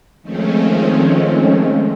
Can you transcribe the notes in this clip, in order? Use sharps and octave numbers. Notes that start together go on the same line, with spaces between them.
D#3 F3 G#3 A3 C4 C#4